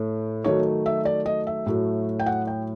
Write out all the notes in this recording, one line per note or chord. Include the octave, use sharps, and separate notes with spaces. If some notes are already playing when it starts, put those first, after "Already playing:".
Already playing: A2 A3
D#3 F#3 A3 C#5
E5
D5
D#5
E5
A2 F#3 A3
G5
F#5
G5